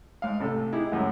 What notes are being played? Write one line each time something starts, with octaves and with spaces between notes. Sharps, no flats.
G#2 F5
A1 C3 A4
D#4 E4 G4 G#4
C#2 F#2 A2